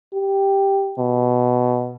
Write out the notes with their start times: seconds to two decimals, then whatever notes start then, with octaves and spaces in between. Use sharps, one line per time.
0.14 G4
0.98 B2